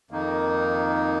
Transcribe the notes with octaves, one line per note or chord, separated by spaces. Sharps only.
F2 D#3 A#3 D#4